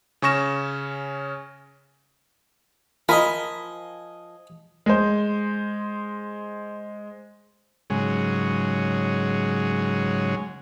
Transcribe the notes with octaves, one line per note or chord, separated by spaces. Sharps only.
C#3 C#4 C#6 A#6 E7
F3 A#4 D#5 G#5 B5
G#3 C5
G#2 C#3 F#3 G#3